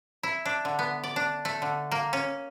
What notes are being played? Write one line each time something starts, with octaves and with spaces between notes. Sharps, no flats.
E4
D4
D3
B3
D5
D4
A3
D3
A#3
C#4